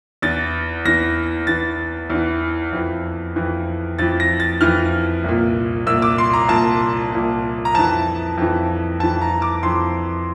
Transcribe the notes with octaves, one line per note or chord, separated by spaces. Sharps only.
E2 E3 A6
E2 E3 A#6
E2 E3 A6
E2 E3
F2 E3
F2 E3
F2 E3 A6
A#6
A6
F2 E3 F6
C2 A#2
C2 A#2 E6
D6
C6
A#5
C2 A#2 A5
C2 A#2
A#5
F2 E3 A5
F2 E3
F2 E3 A5
A#5
D6
F2 E3 C6